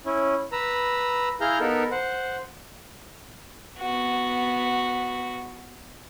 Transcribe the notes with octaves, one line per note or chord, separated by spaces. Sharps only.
C#4 E4
B4 A#5 E6
E4 G#4 F5 A#5 F6 G6
B3 D#4 A4 A#4
C5 F#5
B3 F#4